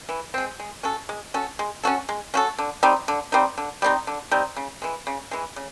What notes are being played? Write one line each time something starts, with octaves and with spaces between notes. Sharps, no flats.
E3
G#3 C4
G#3
C#4 F#4 A4
G#3
C#4 F#4 A4
G#3
C#4 F#4 A4
G#3
C#4 F#4 A4
D3
G3 C4 D#4
D3
G3 C4 D#4
D3
G3 C4 D#4
D3
G3 C4 D#4
C#3
E3 G#3
C#3
E3 G#3
C#3